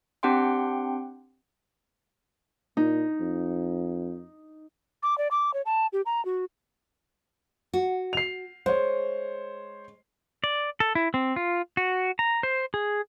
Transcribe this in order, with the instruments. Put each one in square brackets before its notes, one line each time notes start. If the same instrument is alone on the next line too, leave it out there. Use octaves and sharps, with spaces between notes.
[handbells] C4 D4 G4 F#5 G5 C6
[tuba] A#2 [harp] D#4
[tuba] F2
[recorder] D6
D5
D6
C#5
A5
G4
A#5
F#4
[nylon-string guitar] F#4
[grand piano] C7 F7
[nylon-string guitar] G#3 [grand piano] C5 C#5
[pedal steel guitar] D5
A4
E4
C4
F4
F#4
A#5
C5
G#4